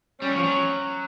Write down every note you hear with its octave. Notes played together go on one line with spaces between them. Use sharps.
G3 C#4
F#3
F3
F#3